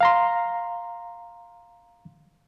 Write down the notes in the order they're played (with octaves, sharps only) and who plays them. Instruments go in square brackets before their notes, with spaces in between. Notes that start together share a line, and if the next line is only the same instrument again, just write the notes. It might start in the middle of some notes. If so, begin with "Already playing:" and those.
[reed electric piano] F5 A#5 C6